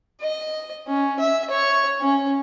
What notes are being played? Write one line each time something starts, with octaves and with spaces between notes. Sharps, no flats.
D#5
C#4
E5
C#5
C#4